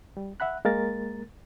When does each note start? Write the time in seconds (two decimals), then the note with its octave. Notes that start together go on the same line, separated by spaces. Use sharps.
0.17 G3
0.40 E5 F#5 B5 F#6
0.65 G#3 A#3 A#4 A6